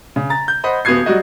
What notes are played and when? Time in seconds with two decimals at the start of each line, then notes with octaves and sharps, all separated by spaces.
0.16 C#3
0.30 A#5 A6
0.48 G6
0.64 C5 D#5 F#5 B5
0.85 D#1 B3 F#4 D#6 G#6 C7
1.06 F#3 G3 F#4 D#5